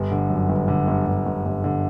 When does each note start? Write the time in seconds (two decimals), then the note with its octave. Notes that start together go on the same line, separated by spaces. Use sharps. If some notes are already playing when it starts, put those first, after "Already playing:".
Already playing: G1
0.11 D3
0.30 F#2
0.49 G1
0.68 D3
0.87 G1
1.07 G1
1.26 G1
1.45 G1
1.64 D3